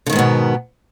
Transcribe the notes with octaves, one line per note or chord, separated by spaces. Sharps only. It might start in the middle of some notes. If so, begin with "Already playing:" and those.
G#2 B2 D3 D#3 B3